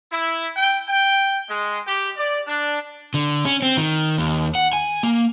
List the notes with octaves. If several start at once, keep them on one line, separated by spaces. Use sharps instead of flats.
E4
G5
G5
G#3
G4
D5
D4
D3
C#4
C4
D#3
D#2
F#5
G#5
A#3